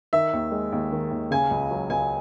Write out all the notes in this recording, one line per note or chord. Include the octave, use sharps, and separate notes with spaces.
D#3 E5
D#2
G#3
D#2
D#3
D#2
C#3 G#5
C#2
F#3
C#2 G#5